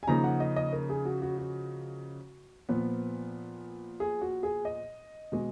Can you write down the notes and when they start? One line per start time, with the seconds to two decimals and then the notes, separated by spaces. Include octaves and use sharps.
0.03 G#5
0.07 C#3 F3 A#3 D#4 A#5
0.24 F#5
0.40 D#5
0.56 D#5
0.73 A#4
0.90 G#4
1.05 F#4
1.22 F#4
1.38 F#4
2.69 A#2 F3 B3 B4
4.00 G#4
4.21 F#4
4.43 G#4
4.65 D#5
5.32 B2 G#3